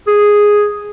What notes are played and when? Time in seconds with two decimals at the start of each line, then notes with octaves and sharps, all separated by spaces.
0.07 G#4